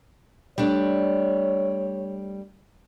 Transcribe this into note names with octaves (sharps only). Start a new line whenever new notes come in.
G3 A3 D4 C#5